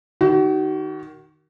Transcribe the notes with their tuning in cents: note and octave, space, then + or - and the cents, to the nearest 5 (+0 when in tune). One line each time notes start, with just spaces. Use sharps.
D#3 +0 F#4 +35